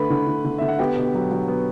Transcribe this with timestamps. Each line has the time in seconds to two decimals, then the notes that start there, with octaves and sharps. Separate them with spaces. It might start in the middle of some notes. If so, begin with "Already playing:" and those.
Already playing: D3 A3 B4 B5
0.10 D3
0.27 D3
0.45 D3
0.58 D3 E5
0.69 F#5
0.79 B3 G4 G5
0.96 B2
1.14 F#3
1.31 F#3
1.48 B3